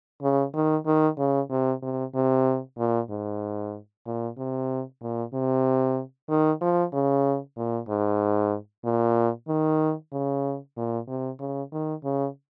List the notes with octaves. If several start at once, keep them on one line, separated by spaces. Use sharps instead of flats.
C#3
D#3
D#3
C#3
C3
C3
C3
A#2
G#2
A#2
C3
A#2
C3
D#3
F3
C#3
A#2
G#2
A#2
D#3
C#3
A#2
C3
C#3
D#3
C#3